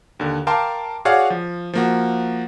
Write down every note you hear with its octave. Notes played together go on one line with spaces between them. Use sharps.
D#2 D3
A#4 F5 G5 A5 C6 D6
F#4 G#4 C#5 D5 F5 F#5
F3
F3 A#3 F#4